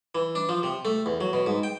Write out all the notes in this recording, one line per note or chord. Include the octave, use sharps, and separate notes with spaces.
E3
D4
F3
C3
A3
E2
F#3
B2
G#2
G5